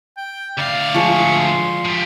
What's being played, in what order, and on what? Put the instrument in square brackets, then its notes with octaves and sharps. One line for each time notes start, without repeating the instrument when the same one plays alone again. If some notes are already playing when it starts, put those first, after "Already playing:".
[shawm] G5
[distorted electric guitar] D2 F5 [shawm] D5
[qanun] F3 G#3 [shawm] C#6
[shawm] C6
[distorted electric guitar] F3 G3